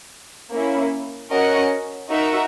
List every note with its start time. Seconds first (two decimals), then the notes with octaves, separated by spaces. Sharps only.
0.52 A#3 C#4 E4
1.31 C#4 F#4 A#4 D#5 F#5
2.10 D#4 F#4 A#4 E5